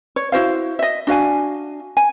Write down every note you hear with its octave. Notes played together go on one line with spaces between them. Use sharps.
C#5
E4 F#4 C5 F5
D#5 E5
D4 F#4 F5 G#5
G#5